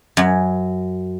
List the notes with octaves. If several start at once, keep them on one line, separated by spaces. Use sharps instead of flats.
F#2